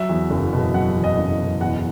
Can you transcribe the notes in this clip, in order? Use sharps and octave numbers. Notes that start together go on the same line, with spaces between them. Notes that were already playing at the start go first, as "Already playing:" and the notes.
Already playing: F#3 E5
E2
F#1
B2
F#3 F#5
E2
D#5
F#1
B2
E2 F#5